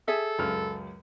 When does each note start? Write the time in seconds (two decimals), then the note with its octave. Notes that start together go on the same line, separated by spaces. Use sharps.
0.08 G#4 A4 E5
0.39 C#2 F#2 F6